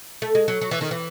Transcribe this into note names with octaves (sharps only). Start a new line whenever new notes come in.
A3
G#3
F#3
F#3
E3
D#3
E3